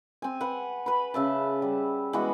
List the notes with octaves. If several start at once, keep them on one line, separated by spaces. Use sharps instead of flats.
C4 G#5
B4 F#5
B4 B5
C#3 E5 A5
G3
E3 G#3 B3 F#4